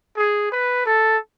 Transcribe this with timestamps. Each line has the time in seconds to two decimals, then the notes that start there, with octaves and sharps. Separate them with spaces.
0.17 G#4
0.52 B4
0.86 A4